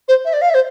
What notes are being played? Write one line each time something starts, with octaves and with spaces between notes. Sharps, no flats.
C5
E5
D5
F5
E5
C5